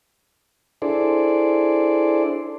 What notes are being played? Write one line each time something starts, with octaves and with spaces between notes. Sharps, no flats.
D4 E4 G#4 A4 C5 D5